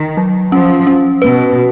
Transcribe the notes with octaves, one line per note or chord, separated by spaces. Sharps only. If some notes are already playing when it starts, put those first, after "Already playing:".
Already playing: D#3
F#3
F3 C#4
C#4
B2 B4